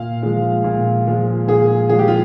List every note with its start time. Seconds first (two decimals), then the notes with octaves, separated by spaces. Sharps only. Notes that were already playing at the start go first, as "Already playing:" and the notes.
Already playing: A#2 F5
0.23 F3 G#3
0.64 A#2
1.06 F3 G#3
1.48 A#2 G#4
1.89 F3 G#3 G#4
1.99 G4
2.08 F4